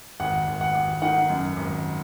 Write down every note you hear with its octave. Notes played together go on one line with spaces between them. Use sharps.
G#1 F#5
G#1
F#5
G#1
D#3 F#5
F#2
G#1